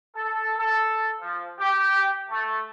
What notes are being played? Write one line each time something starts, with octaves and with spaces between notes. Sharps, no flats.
A4
A4
F3
G4
A3